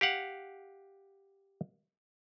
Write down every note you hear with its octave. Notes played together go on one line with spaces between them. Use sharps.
G4 F5 F#5